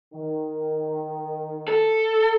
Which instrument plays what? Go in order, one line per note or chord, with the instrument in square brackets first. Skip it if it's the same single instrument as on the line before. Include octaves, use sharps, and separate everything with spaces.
[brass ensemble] D#3
[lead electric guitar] A4